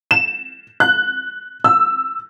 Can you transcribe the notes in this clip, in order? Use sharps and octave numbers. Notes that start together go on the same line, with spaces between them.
E7
F#6
E6